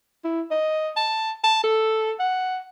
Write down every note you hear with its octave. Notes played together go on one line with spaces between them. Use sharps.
E4
D#5
A5
A5
A4
F#5